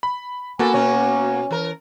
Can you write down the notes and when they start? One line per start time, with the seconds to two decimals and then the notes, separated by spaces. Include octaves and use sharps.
0.03 B5
0.59 A#3 B3 F#4 A4 G#5
0.74 B2 C#4 C#5
1.51 E3 A#4